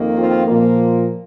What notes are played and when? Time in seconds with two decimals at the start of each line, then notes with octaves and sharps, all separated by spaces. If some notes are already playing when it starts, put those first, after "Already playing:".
Already playing: F2 D#3 A#3
0.17 C4 F4
0.47 A#2 F3 A#3